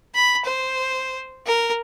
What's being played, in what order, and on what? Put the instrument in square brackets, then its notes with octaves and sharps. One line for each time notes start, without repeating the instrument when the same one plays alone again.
[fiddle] B5
C5
A#4